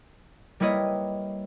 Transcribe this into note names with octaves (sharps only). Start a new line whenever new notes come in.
G3 A#3 E4 B4 C#5 D#5